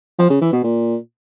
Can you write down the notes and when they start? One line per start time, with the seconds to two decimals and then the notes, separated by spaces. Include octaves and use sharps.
0.19 F3
0.30 C#3
0.41 E3
0.53 B2
0.64 A#2